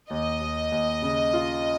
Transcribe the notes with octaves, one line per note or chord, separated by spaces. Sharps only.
D#2 D#5
D#2
D#2
C#3
F4